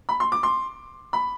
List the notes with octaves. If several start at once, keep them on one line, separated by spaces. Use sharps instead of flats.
B5
C6
D6
C6
B5